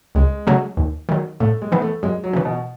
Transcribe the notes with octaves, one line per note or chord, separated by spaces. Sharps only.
C#2 G#3
C#3 F#3 A3
D#2
D#3 F#3
A2 A3
G#3
E3 B3
A3
F#2 G#3
F#3
C#3 E3
B2